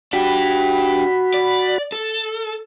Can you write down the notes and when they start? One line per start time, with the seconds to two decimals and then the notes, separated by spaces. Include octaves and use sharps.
0.13 D4 F#4 G4 B5
1.34 D5
1.92 A4